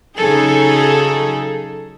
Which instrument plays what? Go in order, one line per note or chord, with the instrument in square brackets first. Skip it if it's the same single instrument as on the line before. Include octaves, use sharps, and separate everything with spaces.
[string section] C#3 F#3 D#4 G#4 A4